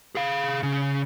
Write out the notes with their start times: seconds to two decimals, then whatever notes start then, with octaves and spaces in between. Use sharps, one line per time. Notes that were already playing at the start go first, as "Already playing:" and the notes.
0.15 G#4 F5
0.63 C#3